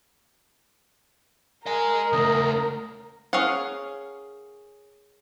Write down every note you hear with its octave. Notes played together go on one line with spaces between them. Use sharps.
A#4 D#5 G#5
C#3 A3 D#5
C#4 G#4 A#4 F5 F#5